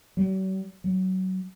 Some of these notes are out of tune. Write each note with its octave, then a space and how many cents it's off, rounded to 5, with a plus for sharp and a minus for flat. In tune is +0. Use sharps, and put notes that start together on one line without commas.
F#3 +45
F#3 +20